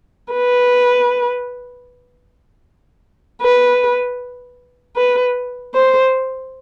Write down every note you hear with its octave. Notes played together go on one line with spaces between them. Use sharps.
B4
B4
B4
C5